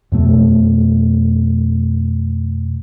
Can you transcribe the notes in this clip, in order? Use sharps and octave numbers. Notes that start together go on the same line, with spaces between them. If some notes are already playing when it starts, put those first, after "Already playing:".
F2 B2 A3